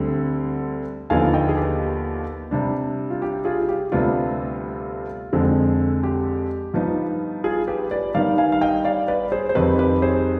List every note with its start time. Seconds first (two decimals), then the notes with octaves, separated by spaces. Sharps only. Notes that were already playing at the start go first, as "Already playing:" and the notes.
Already playing: D2 D3 G3 C4
1.10 D#2 D3 F3 B3 D#4 F5 G#5
1.34 D#5 G5
1.49 G#4
1.57 G4 B4
2.51 C3 G3 D4
3.10 F4
3.22 G4
3.45 F4 G#4
3.61 F4
3.68 G4
3.92 D2 C3 G3 B3 D4 F4
5.33 F2 D3 G#3 C4
6.03 G4
6.74 G2 F3 B3 D#4
7.44 F4 G#4
7.68 G4 B4
7.91 B4 D5
8.14 G2 D#3 G3 B3 D#4 D5 F5
8.38 F5 G#5
8.52 F5
8.61 D#5 G5
8.84 D5 F5
9.08 B4 D5
9.32 G#4 C5
9.49 C5
9.55 F2 D#3 G3 C4 D#4 G4 B4
9.79 G4 B4
10.02 G#4 C5